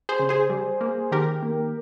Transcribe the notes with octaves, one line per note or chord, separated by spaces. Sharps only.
G#4 C5
C#3
G#4 C5
G3
A#3
D#3 G4 A#4
A#3